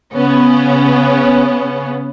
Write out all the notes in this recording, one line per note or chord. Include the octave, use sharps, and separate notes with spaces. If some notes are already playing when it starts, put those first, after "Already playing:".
C#3 B3 C#4